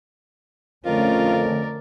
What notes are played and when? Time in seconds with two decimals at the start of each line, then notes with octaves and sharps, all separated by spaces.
0.85 F2 D3 A3 C#4 F4 A#4 D5